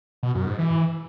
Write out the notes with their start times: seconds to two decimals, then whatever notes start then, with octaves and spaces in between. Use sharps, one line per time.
0.23 B2
0.35 F#2
0.47 G#2
0.59 E3